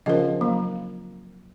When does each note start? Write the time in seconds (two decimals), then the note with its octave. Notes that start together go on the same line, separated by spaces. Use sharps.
0.06 C#3 F3 A#4 D#5
0.41 F#3 A#3